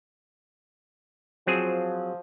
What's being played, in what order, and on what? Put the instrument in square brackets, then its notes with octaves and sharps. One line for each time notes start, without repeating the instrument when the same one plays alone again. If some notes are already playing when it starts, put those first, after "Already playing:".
[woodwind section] F3 [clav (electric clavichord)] F#3 C4 G#4